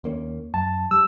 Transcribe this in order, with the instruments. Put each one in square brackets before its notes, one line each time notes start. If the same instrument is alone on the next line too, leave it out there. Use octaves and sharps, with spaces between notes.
[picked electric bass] D#2 A#3 C#4
[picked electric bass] F#2 [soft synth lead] A5
[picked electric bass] G3 [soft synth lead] E6